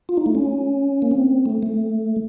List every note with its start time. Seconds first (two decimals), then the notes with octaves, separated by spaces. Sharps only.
0.09 F4
0.17 D#4
0.26 A3
0.35 C#4
1.02 A#3
1.11 C4
1.46 A3
1.63 A3